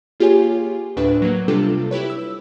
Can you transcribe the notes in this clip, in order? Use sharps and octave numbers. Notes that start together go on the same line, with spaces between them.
A#3 F4 G4 G#4 C#5 G#5
D2 A2 D4 B4
F#3 A#3
C3 G3 D4 F4 A4
E4 G4 B4 C#5
E6